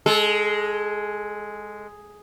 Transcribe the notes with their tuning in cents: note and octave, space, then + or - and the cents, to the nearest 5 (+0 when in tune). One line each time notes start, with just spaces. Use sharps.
G#3 +0 A4 -25